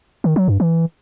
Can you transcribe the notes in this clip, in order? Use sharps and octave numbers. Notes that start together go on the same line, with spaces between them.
D#3
F#3
G2
E3